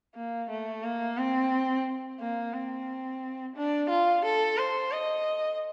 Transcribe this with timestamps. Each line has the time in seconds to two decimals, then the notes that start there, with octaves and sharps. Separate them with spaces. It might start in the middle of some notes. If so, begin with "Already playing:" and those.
0.15 A#3
0.50 A3
0.84 A#3
1.18 C4
2.20 A#3
2.54 C4
3.56 D4
3.90 F4
4.25 A4
4.58 C5
4.92 D#5